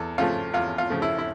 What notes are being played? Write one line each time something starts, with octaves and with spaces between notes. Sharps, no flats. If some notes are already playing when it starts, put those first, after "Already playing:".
Already playing: E2 A4
C#3 F3 A3 F4
E2 F4
F4
C#3 F3 A3
E4
E4